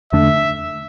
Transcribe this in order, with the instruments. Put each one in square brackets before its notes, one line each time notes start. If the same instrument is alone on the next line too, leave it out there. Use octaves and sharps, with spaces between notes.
[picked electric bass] E2 D3 A3 D4 [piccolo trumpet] E5